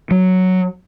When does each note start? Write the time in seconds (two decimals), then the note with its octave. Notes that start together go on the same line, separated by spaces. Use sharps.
0.11 F#3